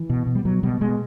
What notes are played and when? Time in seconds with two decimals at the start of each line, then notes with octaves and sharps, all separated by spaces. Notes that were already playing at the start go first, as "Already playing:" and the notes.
Already playing: E3
0.10 B2
0.27 B2
0.35 G3
0.45 B2 F#3
0.63 B2 G3
0.81 B2 G#3